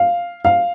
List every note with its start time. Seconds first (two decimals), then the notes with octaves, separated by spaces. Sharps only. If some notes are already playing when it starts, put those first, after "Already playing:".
Already playing: F5
0.45 F5